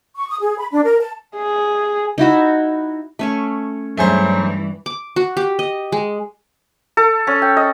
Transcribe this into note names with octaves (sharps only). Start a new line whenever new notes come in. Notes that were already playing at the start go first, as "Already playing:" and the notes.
C#6
D#6
G#4
B5
D4
A#4
A5
G#4
D#4 E4 F#4 E5
A3 C#4 C#5
G2 E3 F#3 A3 G#4 B4 C5
D6
F#4
G4
D#5
G#3
A4
C#4
G5
D#5